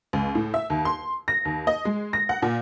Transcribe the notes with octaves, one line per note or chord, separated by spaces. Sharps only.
C#2
A2
E5
D#2
C6
A#6
D#2
D#5
G#3
A#6
F#5
A#2